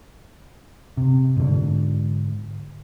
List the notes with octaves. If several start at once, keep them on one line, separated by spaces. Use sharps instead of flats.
C3
G#2 D3